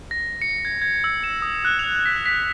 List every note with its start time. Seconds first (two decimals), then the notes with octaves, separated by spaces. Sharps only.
0.11 A#6
0.42 C#7
0.65 G#6
0.82 G#6
1.04 E6
1.24 E7
1.42 D#6
1.65 F#6
1.79 F7
2.06 B6
2.26 B6